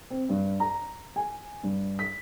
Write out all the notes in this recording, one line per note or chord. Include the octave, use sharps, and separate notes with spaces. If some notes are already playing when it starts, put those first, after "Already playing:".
C4
G2
A#5
G#5
G2
B6